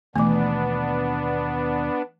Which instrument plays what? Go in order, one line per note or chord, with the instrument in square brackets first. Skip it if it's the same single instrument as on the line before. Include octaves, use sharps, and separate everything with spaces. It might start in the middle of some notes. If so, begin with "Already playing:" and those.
[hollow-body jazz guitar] D#2 B2 [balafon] E3 A3 [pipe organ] B3 D4